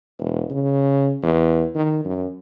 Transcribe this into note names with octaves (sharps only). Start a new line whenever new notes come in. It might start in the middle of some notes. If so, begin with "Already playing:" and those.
E1
C#3
E2
D#3
F#2